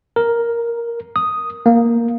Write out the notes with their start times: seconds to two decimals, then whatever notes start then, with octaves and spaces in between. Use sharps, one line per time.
0.16 A#4
1.16 D#6
1.66 A#3